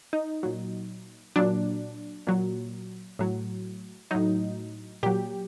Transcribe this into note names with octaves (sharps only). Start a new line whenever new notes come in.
D#4
A#2 F#3
A#2 F#3 D4
A#2 F#3
A2 F#3
A2 F#3 D#4
A#2 F#3 G4